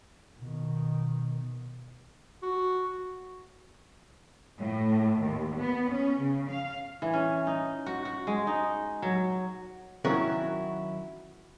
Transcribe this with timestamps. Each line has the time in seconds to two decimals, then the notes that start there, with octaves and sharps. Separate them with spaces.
0.38 B2 D#3
2.43 F#4
4.60 A2
5.22 D#2
5.57 B3
5.91 C#4
6.20 C#3
6.50 F5
7.02 E3
7.13 C#4
7.47 D#4
7.86 F#4
8.05 F#4
8.27 G#3
8.47 D#4
9.02 F#3
10.05 D#3 F#3 C#4 E4 F#4 A#4